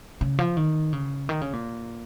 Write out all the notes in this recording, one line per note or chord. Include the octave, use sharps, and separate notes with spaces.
C#3
F3
D#3
C#3
D#3
C#3
A#2